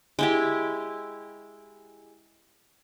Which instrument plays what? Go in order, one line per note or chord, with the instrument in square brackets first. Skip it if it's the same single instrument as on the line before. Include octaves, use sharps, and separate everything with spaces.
[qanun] G#3 E4 G4